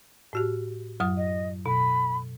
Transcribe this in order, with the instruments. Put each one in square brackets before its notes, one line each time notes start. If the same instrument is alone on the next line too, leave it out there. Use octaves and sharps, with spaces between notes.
[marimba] A2 F#4 G4
F#2 F#3 D#6
[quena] D#5
[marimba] B2 [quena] B5